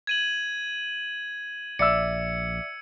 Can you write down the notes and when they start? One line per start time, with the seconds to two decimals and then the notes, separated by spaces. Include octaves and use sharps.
0.07 G#6 D#7 F#7
1.79 A#1 D5 E5 E6 C#7